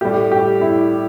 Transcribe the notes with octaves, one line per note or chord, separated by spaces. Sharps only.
A2 G3 G4
G4
E4